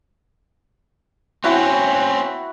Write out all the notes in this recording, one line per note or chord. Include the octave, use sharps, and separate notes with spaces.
C4 C#4 E4 F#4 F#5